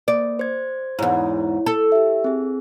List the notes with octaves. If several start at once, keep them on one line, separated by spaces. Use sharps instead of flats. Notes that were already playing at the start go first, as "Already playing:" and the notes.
A#3 D5
C5 G#6
E2 G#2 E4 C#5
A4
G4 E5
C4 G#4